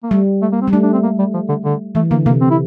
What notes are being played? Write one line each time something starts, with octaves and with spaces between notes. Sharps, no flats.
A#3
G3 A3
A3
A#3
C4
G3
A3 D4
D4
C4
A#3
G3
F3
D3
D3
E3 A3
D3 A#3
C3 A#3
C4
E4